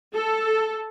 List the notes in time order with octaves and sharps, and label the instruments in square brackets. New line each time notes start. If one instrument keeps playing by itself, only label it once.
[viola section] A4